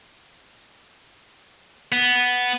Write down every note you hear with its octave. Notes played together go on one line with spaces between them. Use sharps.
B3